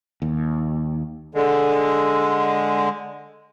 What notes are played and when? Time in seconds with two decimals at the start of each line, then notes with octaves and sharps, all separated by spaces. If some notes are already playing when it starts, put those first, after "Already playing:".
0.22 D#2
1.35 D3 G#3